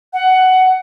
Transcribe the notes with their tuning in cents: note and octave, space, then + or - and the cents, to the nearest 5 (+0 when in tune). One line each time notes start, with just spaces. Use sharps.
F#5 +15